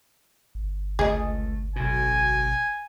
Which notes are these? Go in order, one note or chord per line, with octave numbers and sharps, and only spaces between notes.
G1
C#2 A3 G#4 D#5
B1 B2 G#5